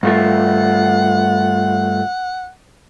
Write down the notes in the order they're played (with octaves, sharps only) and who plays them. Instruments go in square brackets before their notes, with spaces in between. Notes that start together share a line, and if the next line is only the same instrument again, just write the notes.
[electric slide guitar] G2 A3 F4 [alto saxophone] F#5